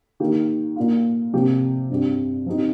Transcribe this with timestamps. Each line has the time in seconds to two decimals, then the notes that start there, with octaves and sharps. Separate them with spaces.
0.20 D#3 A#3 G4
0.76 A#2 A#3 F4
1.33 C3 F3 A#3 G4
1.90 G2 G3 C4 G4
2.46 F3 C4 D#4 G4